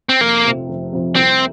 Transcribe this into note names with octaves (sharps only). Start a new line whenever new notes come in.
C4
F1 A#3
F2 C3 F3
F1
F2 C3 F3
C2 C4